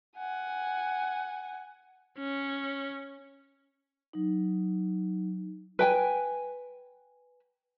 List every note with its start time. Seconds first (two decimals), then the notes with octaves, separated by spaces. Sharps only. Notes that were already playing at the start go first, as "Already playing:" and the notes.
0.17 F#5 G#5
2.18 C#4
4.13 F#3 D#4
5.79 B4 G5 G#5